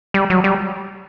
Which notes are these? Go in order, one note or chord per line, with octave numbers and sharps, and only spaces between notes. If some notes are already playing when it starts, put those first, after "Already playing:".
G3
F#3
G3